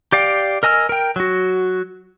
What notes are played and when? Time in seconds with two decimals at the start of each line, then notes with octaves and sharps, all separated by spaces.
0.12 G4 D5 F5 G5
0.63 A#4 D#5 G#5 E6 F6
0.89 A#4 G5
1.16 F#3 F#4